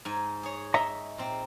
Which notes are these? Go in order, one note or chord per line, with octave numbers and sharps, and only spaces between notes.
G#2 G#5
G#4 C#5
D#5 E5 A#5
A#2 C4